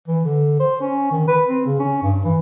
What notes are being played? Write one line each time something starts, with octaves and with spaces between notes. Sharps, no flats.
E3
D3
C5
C#4
D#3
B4
C4
C#3
C#4
G2
E3